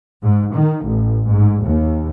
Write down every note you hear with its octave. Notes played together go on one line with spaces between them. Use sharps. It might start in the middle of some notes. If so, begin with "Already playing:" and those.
G#2
D#3
A1
G#2
D#2